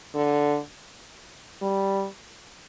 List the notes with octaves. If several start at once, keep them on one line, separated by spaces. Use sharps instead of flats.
D3
G3